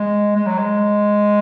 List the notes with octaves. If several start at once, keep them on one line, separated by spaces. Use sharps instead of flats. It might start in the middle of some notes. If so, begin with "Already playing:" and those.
Already playing: G#3
G#3
F#3
G#3